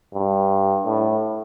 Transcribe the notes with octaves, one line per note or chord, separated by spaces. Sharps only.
G2
A2